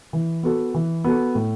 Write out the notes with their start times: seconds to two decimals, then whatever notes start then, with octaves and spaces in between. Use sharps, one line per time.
0.13 E3
0.43 B3 F#4 A4
0.74 E3
1.04 B3 F#4 A4
1.35 A2